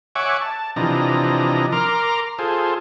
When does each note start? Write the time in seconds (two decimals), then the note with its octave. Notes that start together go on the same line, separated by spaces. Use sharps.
0.15 C#5 E5 F#5 G#5 C#6 D6
0.41 A5
0.76 C3 E3 F3 D4 D#5 A#5
1.72 A#4 A#5 C6 D6 F6
2.39 F4 G#4 A4 C5